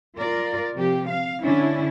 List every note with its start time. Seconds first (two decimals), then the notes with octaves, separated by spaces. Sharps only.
0.18 F4 A#4 D5
0.73 C3 F3 G4
1.09 F5
1.44 D3 C#4 D4 E4